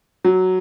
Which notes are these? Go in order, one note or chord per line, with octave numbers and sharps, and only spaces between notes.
F#3